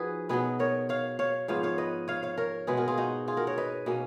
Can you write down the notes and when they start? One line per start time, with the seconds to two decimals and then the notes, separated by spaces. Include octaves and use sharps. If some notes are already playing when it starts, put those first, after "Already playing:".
Already playing: F3 D#4 F#4 G#4 B4
0.29 B2 F#3 B3 G#4 B4
0.59 A#4 C#5
0.89 C#5 F5
1.19 C#5 F5
1.48 G#2 F3 B3 C#5 F5
1.63 C#5 F5
1.78 B4 D#5
2.08 C#5 F5
2.23 C#5 F5
2.38 A#4 C#5
2.67 B2 G#3 B3 G#4 B4
2.77 F#4 A#4
2.88 F4 G#4
2.98 D#4 F#4
3.28 F4 G#4
3.37 F#4 A#4
3.47 A#4 C#5
3.58 B4 D#5
3.86 B2 A#3 C#4